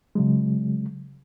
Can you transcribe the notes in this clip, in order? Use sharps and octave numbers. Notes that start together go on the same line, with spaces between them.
C#3 F#3 G#3